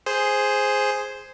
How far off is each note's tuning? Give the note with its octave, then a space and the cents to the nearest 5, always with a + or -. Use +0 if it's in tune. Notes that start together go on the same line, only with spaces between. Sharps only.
G#4 +0 C5 +0